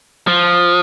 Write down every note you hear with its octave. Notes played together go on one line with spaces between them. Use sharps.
F3